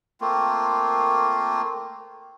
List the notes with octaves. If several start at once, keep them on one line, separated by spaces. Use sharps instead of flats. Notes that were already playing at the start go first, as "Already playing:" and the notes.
A3 A#3 C4 F4